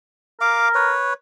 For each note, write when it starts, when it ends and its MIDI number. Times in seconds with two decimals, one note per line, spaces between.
0.41 0.91 70
0.41 0.69 77
0.41 0.69 86
0.75 1.13 71
0.75 1.13 73